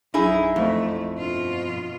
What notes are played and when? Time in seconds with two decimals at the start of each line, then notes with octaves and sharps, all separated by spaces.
0.14 A#1 F#2 D#4 E4 G#4
0.56 A1 F2 A3
1.18 G2 B2 F4